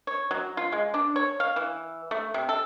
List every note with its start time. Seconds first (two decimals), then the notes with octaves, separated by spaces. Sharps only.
0.07 C#5
0.31 F#3
0.57 F4
0.72 G#3
0.94 D4
1.16 C#5
1.40 F5
1.56 E3
2.11 A3
2.34 C3
2.49 A4